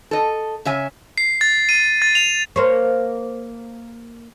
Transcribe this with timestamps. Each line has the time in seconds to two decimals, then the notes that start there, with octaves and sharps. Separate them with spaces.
0.11 A4 D#5
0.65 C#3 C#5 E5 G#5
1.18 C7
1.41 A6
1.69 D#7
2.02 A6
2.15 F7
2.56 A#3 C5 C#5